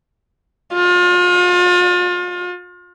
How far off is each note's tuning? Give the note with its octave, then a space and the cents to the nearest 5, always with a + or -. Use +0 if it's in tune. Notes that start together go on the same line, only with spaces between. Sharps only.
F4 +35